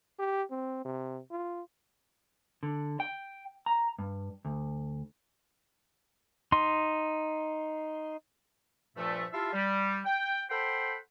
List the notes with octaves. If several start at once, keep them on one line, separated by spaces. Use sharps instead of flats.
G4
C4
C3
F4
D3
G5
A#5
G2
D2
D#4 C6
G2 A#2 F3 A3
E4 F4 G4 E5 F5 A5
G3
G5
A4 C5 F#5 G5 B5 C6